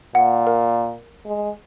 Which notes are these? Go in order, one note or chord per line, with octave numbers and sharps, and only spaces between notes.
A#2 F#5
A#4
G#3